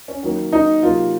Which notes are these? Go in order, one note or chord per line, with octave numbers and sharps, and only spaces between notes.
C#4
D#3 F#3 A#3
D#4
C3 F#3 A#3 F4